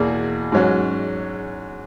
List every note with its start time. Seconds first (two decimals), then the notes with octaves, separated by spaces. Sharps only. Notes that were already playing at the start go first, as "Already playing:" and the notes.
Already playing: E2 B2 A#3 G#4
0.52 G#2 F#3 C#4